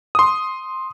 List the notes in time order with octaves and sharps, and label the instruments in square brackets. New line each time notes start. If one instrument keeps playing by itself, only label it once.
[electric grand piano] C6 D#6